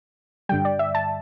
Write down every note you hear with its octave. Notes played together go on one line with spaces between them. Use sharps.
G2 D3 G3 G5
D5
E5
A5